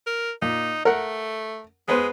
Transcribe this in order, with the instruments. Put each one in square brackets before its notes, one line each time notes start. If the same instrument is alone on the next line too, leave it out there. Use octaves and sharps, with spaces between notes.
[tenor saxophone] A#4
[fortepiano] A#2 [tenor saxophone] D#4
[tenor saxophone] A3 [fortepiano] A#4 F#5
[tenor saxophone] G#3 [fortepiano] B3 B4 C5